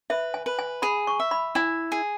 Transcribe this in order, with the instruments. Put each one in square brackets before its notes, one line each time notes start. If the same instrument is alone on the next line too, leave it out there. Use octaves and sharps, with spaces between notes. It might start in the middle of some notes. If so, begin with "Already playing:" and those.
[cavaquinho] B4 [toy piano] E5
[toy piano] G#5
[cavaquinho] B4
[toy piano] G#5
[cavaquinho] G#4 [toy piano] B5
[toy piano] C#6
[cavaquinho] E5
[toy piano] B5
[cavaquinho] E4 [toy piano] G#5
[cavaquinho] G#4